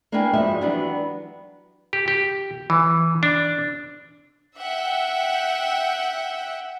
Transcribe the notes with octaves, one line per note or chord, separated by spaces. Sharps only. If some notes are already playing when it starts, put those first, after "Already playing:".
A#3 D4 E4 B4 G5 G#5
F3 G#3 D#4 F#4 D5 E5
E3 F#3 G3 B3 D4 F#4
G4
G4
E3
D4
E5 F#5 G5